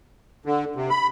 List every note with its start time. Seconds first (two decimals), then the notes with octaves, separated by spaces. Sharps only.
0.46 D3
0.76 C3
0.90 B5